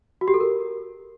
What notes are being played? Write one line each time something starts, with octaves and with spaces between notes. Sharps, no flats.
F#4
G4
A4
A#4